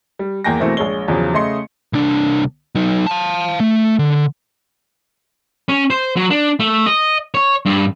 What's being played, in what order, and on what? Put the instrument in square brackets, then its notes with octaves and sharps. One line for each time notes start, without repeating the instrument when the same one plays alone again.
[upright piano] G3
E2 A#3 G5 G#5 A#6
B2 E3 A3 A#3 C4
A#1 G#3 C#5 G7
E2 C#3 F3 F#3
C#3 A3 D#5 C6 C#7
[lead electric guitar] C2 D4
F#3 D#4
F5 A5
A3
D3
[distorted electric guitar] C#4
C5
F#3
D4
A3
D#5
C#5
G2